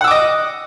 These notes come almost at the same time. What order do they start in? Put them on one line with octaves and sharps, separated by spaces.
F#5 E6 D6 D#5